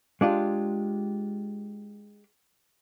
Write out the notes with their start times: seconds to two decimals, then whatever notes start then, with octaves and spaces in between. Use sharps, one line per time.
0.21 G#3 D4 F4 G4